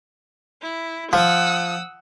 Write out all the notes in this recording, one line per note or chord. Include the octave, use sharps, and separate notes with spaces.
E4
F3 F#5 D#6 E6